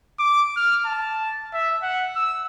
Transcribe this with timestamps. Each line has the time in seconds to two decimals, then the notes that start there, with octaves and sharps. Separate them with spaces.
0.19 D6
0.57 F6
0.86 A5
1.53 E5
1.83 F#5
2.16 E6